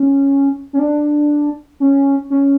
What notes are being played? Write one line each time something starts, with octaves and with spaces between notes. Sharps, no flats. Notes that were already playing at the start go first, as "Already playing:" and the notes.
Already playing: C#4
C#4
D4
C#4
C#4